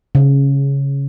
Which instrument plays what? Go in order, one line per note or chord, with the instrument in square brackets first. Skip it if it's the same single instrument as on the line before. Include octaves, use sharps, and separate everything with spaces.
[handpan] C#3